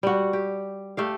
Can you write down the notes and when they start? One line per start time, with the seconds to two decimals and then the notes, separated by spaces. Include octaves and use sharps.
0.03 G3 F#4
0.33 G4
0.97 A3 G4 F5